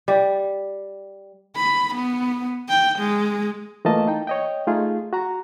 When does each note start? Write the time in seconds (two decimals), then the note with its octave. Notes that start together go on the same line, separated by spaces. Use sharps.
0.08 G3
1.56 B5
1.95 B3
2.69 G5
2.99 G#3
3.85 E3 A3 A#3 F4 D#5 A5
4.08 D#4 G5
4.27 C#5 D#5 G5
4.67 A3 D#4 F4 G#4
5.13 F#4 A#5